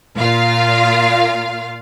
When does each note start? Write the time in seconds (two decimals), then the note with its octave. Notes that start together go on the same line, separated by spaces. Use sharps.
0.18 A#2 F4 F5